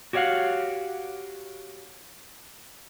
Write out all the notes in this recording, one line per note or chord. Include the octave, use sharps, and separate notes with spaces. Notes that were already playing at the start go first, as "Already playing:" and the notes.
F#4 G4 C#5 D5 F5 F#5